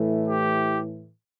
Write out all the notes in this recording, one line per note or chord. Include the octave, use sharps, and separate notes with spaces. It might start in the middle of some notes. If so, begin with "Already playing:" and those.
Already playing: A2 E3 A3
G4